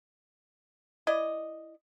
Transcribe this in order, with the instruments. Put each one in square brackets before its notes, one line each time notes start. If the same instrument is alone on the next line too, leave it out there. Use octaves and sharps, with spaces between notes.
[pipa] E4 D5 D#5